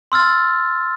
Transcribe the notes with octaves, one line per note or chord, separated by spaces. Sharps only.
C6 E6 F6 A6